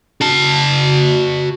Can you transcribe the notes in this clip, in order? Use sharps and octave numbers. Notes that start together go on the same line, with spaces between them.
F#4 A5